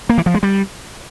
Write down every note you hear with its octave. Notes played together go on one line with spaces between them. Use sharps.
A#3
E3
F3
G#3
G3